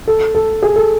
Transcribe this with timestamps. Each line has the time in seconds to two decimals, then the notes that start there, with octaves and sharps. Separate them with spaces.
0.08 A4
0.35 A4
0.62 G#4
0.76 A4